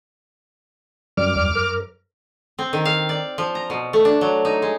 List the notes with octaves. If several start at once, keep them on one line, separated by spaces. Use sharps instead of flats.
F#2 G3 D6 F6
E2 G3
A#4
C4
D#3
F5
D5
F3
A#5
B2
A3
D4
F#3
D#4
G#3